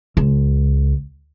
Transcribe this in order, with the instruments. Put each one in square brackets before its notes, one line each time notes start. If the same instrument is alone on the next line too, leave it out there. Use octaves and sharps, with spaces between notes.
[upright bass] C#2